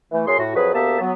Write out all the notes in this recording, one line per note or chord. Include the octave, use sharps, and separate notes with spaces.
E3 A3
F#2 C#4 G#4 C6
A2 F#4
F2 F#3 G#4 B4
D2 A#3 B3 G4 E5 A5
F#3 B3